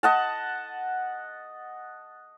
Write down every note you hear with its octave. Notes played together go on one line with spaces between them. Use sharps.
D#5 F#5 A5